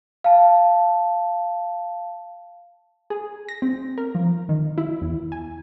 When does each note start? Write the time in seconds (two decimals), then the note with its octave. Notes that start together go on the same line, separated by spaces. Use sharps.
0.24 F5 A5
3.10 G#4
3.49 A#6
3.62 C4
3.98 A#4
4.15 F3
4.49 D#3
4.78 E4
5.01 E2
5.32 G#5